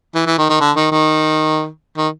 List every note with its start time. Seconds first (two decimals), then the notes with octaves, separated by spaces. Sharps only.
0.15 E3
0.26 E3
0.38 D#3
0.49 D#3
0.60 D3
0.76 D#3
0.91 D#3
1.97 D#3